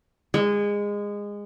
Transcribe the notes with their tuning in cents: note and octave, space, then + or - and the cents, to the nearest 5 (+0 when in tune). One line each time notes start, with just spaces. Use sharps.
G#3 -20